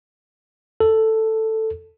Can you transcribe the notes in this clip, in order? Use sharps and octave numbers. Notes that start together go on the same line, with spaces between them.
A4